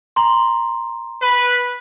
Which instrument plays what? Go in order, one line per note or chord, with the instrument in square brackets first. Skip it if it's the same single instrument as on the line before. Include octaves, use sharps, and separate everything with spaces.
[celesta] A#5 C6
[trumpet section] B4